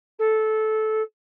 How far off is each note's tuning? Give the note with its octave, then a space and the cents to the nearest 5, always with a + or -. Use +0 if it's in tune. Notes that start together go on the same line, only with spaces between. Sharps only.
A4 -15